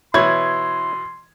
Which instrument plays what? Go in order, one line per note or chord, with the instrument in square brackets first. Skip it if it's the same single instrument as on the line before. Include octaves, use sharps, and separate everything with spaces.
[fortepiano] B2 E3 [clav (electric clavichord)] E4 C#5 [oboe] C6 [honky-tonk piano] G#6